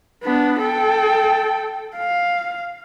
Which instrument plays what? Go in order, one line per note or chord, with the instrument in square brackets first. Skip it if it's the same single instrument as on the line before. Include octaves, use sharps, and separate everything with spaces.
[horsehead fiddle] B3 D4
A4 G5
F5